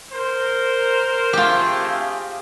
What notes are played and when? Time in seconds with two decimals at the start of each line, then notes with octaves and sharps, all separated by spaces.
0.12 A#4 C5
1.33 A3 C4 F4 G4 G#4